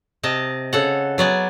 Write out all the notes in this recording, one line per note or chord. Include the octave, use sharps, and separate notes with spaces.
C3 D#5 A5
C#3 A4 F#5
F#3 B3 D5 G#5